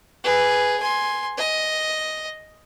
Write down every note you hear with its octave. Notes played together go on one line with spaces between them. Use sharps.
G#4 B4
G#5 C6
D#5